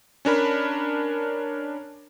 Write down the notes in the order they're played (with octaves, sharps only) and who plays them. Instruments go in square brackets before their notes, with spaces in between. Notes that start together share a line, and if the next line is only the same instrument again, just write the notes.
[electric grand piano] C#4 D4 A#4 B5